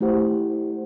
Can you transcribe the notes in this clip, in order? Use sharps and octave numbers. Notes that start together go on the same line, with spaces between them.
A3 E4 G4 C5 F#5